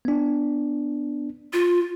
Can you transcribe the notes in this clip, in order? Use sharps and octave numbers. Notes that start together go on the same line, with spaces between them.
B3 D4
F4